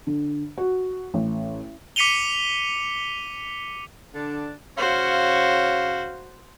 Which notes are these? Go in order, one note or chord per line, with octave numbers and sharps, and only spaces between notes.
D3
F#4
A1
D6 B6 C#7 D#7 F7 G7
D3 D4
C#3 F#4 C5 C#5 F5